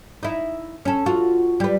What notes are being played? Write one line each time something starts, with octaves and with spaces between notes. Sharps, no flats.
D#4 E4
C#4 A4
F4 F#4
G3 B4